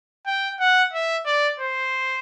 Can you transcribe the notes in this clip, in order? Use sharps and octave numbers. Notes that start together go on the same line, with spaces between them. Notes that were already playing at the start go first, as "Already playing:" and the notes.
G5
F#5
E5
D5
C5